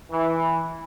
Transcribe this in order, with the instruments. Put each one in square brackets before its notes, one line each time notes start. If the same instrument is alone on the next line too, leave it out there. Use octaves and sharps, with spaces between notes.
[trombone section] E3